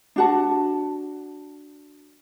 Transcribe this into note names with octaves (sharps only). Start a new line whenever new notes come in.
D4 F#4 A5